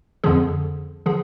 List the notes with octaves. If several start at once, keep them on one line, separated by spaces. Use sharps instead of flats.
F2 D3 F3 G#4
D3 F3 G#4